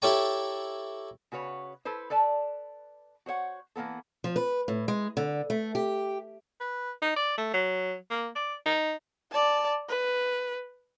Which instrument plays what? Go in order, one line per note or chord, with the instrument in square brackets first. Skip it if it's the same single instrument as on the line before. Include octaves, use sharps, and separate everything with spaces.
[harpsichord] E4 G4 A4 C#5 G5 A#5
[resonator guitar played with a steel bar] C#3 F#4 B4 C#5
E4 A4 B4 C5
A4 B4 D5 A5
F#4 C5 C#5 F#5
E3 A#3 B3 A4
[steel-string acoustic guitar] F3
B4
A2
G#3
D3
A3
G4
[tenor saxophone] B4
D#4
D5
A3
F#3
A#3
D5
D#4
[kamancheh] D5 A5
B4